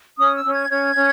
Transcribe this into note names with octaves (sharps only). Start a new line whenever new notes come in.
C#4 D#6
E6
C#4
G#6
C#4 G#6
C#4